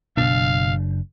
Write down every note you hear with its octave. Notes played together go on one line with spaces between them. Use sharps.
F#1 B2 D4 F5